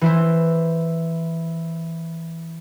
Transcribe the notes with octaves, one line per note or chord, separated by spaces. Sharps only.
E3 E4 C5